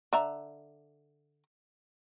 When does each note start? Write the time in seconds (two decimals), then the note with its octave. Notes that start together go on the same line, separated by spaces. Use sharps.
0.13 D3 E5 A#5